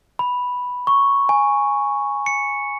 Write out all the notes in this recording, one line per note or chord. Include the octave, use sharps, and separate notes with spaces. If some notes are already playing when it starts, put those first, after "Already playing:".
B5
C#6
G#5
C#7